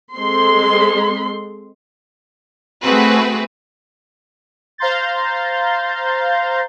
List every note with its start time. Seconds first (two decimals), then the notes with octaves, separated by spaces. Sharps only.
0.15 G#3 C4 A4 C6
2.82 A3 C4 F#4 G#4 B4
4.78 C5 F5 A#5 C6 G6 A6